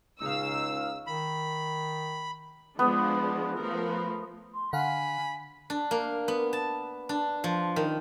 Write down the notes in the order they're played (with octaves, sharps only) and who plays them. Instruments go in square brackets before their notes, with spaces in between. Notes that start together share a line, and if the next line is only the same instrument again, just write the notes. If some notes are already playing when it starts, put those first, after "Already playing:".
[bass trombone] C#2 [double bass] C#3 [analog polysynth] D#4 F5 [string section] E6
[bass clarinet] D#3 [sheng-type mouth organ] B5
[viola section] F3 G#3 D4 [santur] B3
[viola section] F3 A3 A#4
[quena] C6
[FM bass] D3 [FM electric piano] F5 F#5 [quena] G#5 [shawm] B5
[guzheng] D4
A#3
B3
A5
D4
F3
D#3